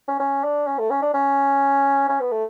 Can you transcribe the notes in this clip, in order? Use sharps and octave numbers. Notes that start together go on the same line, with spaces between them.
C#4
C#4
D4
C#4
A3
C#4
D4
C#4
C#4
B3
A3